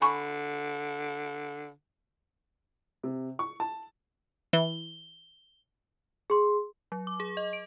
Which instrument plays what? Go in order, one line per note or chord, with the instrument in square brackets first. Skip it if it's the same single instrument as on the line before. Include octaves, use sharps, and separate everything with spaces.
[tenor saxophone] D3 [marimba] G#5 B5 C#6
[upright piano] C3
C#6
A5
[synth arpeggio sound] E3 [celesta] G7
[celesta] G#4 C6
[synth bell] F#3
D6
G#4
D#5
D7